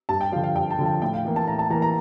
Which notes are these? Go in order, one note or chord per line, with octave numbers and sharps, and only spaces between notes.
G2 A5
G5
D3 F3 F5
F5
G2 G5
A5
D3 F3
A5
A2 G5
F5
E3 A#3
A5
A2 A#5
A5
E3 A#3 A#5
A#5